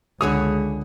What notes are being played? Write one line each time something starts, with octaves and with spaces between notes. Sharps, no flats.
C#2 D3 G#3 G#4 B4 C#5 D#6